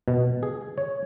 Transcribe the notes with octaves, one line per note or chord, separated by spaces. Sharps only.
B2
G#4
C#5